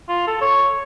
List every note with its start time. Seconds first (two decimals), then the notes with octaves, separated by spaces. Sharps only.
0.09 F4
0.27 A4
0.41 C#5